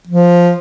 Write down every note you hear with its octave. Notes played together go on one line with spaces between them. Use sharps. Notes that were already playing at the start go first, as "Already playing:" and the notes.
F3